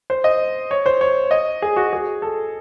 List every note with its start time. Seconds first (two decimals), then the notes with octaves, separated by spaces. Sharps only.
0.10 C5
0.24 D#5
0.71 C#5
0.86 C5
1.01 C#5
1.31 D#5
1.62 G#4
1.76 F#4
1.93 G#4
2.22 A4